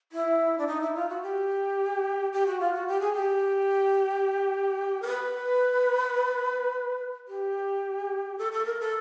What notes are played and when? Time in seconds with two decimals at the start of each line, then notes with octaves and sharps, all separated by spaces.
0.12 E4
0.58 D4
0.67 D#4
0.81 E4
0.95 F4
1.09 F#4
1.22 G4
2.33 G4
2.47 F#4
2.60 F4
2.74 F#4
2.88 G4
3.00 G#4
3.14 G4
5.02 A#4
5.08 B4
7.28 G4
8.38 A4
8.52 A4
8.65 A#4
8.80 A4